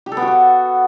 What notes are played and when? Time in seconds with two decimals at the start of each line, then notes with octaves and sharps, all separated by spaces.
0.06 G4
0.12 A4
0.17 B3
0.22 F#4
0.27 B3